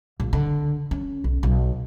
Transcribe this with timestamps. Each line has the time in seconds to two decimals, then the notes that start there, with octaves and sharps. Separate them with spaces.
0.20 A#1
0.33 D3
0.91 C#4
1.24 B1
1.43 B1